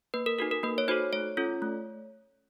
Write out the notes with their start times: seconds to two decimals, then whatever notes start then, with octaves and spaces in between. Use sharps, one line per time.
0.14 A#3 B4
0.26 A#4
0.39 D#4 F#4 A4 A#4
0.51 A#4
0.63 A#3 B4
0.78 C#5
0.88 D#4 F#4 A4 C5
1.13 A3 C#5
1.37 C#4 F4 A4
1.62 A3